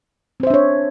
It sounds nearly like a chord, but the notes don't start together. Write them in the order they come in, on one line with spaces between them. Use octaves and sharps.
C4 C5 E5 D4 C#5